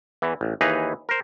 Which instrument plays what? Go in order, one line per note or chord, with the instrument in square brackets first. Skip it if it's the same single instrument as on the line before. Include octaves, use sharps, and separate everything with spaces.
[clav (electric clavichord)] E2 E3
A1
D#2 E3 D#4 G#4 B4 A#5
A#4 C5